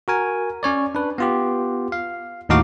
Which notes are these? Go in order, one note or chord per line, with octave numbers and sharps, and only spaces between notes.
F#4 A#4 G#5
C#4 C#5 D5
D4 B4
B3 F4 G4
F5
D#2 A2 D#4 F#4 F5 D6